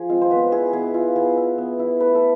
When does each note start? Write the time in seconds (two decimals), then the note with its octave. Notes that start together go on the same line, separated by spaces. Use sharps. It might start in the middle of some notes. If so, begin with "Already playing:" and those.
Already playing: F3 G#4
0.09 G#3 C4 F4
0.21 C5
0.30 B3 B4
0.52 E4 G#4
0.73 B3 G#4
0.94 E4 F4
1.16 B3 G#4
1.37 E4
1.58 B3
1.79 E4
2.00 A3 B4
2.15 A4